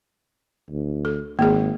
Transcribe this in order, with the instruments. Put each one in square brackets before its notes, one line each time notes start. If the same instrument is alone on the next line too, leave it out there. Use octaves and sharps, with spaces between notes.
[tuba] D2
[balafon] A4
[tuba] G#1 [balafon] A#3 G#4